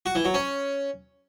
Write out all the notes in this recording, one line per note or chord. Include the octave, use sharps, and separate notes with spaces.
F#4
E3
F#3
C#4